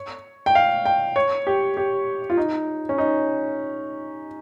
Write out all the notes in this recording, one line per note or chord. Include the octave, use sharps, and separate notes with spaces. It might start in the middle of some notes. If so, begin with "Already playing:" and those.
Already playing: C#5
G5
F5
G5
C#5
G4
G4
F4
D#4
C#4
D#4